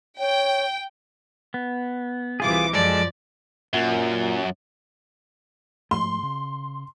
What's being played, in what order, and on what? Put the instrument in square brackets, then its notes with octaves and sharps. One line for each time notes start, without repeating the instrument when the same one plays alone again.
[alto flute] C#5 [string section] G5
[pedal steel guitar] B3
[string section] C2 E3 D6 [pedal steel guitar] F4 G#4
[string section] F#2 F3 [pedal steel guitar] G#3 A4 [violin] D5
[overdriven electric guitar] F#2 [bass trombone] A#2
[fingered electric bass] G#2 F3 A3 [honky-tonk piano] C6
[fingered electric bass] C#3